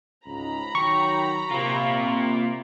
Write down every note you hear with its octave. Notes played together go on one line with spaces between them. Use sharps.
C#2 G#2 A#5 B5
D#3 F#3 G5 C#6
C3 A#3 F4